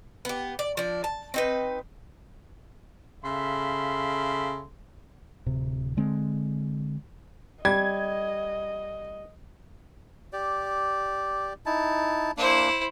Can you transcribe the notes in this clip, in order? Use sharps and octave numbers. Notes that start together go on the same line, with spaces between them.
B3 G4
D5
F3 D4
A5
C4 D#4 B4
C#3 A4 E5 F5 B5 C6
D1 C3
D3 G#3 C4
G3 D#5 G#6
G4 D5
D#4 E4 A5
A#3 D4 E4 C5